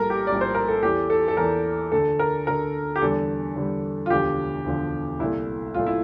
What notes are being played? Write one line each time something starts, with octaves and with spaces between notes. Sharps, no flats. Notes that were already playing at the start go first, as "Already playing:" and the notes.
Already playing: A#1 A2 G3 A4 A#4
G4
A#1 A2 G3 D5
C5
A#4
A4
E2 E3 A3 G4
A4
A4
E2 E3 A3 A#4
D2 D3 A3 A4
A#4
D2 D3 A3 A#4
G4
E2 D3 G3 A4
E2 D3 G3
F4
E1 D2 D3 F3 G4
E1 D2 D3 F3
C2 A#2 A3 E4
C2 A#2 A3 F4
E4